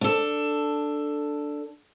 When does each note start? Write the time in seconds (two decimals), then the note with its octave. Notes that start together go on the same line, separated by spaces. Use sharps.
0.01 D4 A4